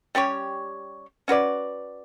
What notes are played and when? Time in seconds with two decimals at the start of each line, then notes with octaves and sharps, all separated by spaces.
0.15 G3 C#4 G4 C#5
1.28 C#4 F#4 B4 D5